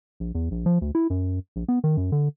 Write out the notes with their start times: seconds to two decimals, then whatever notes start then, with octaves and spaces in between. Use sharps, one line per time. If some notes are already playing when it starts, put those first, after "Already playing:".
0.20 A#1
0.35 E2
0.51 A#1
0.66 F3
0.82 D2
0.95 E4
1.10 F#2
1.56 A#1
1.68 B3
1.84 D#3
1.97 F#2
2.12 D3